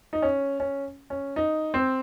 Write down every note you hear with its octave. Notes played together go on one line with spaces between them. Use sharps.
D#4
C#4
C#4
C#4
D#4
C4